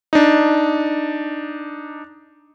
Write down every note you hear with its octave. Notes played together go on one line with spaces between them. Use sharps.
D4 D#4